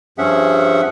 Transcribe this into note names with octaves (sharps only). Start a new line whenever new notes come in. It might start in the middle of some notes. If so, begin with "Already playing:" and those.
G2 F3 C#4 G#4 E5 F#5